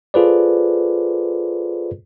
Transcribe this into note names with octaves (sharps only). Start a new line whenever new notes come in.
F4 G#4 A4 B4 C5 D5